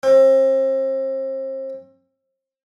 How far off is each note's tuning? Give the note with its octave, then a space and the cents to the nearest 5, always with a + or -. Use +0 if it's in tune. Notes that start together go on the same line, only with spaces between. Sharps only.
C4 +35